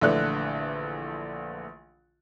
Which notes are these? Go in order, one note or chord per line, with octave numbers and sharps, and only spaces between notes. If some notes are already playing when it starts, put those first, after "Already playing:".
A#1 D3 E3 A3 D5 F#6